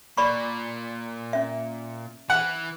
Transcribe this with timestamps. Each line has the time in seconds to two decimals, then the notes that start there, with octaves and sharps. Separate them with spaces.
0.17 A#2 D5 B5 C#6
1.33 C#4 E5
2.30 E3 F#5